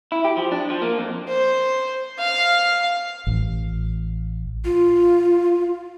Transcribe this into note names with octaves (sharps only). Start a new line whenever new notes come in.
E4
G4
F3
D4
F3
A#3
F2
C5
F5
A1
F4